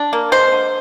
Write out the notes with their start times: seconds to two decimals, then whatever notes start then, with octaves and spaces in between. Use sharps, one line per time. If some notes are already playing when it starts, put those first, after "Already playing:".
Already playing: D4
0.13 A#3
0.32 G#3 C5
0.52 D3